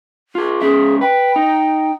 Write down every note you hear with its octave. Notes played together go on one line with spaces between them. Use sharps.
F4 G#4
C#2 C#4 G#4 E5
B4 G5
D#4